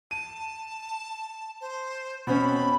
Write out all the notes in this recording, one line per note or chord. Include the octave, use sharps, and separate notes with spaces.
A5 D#7
C5
B2 C4 C#4 B5